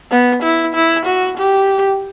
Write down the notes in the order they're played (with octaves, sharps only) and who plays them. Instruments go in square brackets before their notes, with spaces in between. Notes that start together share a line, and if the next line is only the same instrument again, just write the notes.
[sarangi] B3
E4
E4
F#4
G4